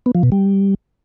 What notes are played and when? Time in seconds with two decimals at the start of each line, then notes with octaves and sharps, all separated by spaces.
0.06 B3
0.15 F3
0.23 B2
0.32 G3